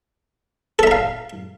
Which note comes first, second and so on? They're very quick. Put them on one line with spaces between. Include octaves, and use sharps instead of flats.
A4 E5 A#5 F5